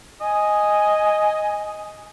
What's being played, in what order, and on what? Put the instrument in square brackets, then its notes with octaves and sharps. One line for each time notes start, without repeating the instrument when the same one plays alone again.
[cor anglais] D#5 [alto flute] G#5